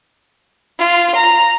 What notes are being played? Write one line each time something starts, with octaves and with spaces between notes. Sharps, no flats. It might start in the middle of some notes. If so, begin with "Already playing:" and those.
F4
A#5